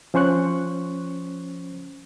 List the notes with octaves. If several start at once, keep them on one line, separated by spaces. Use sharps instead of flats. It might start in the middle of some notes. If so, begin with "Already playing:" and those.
F3 C#4 C5 C#6 F#6